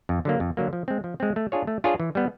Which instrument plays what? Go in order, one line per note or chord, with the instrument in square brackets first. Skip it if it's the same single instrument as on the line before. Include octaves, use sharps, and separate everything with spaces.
[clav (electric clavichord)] F2
D3 F#3 A#3
F2
D3 F#3 A#3
F3
G#3 C4
F3
G#3 C4
A3
D4 F4 G#4 C#5
A3
D4 F4 G#4 C#5
E3
G3 B3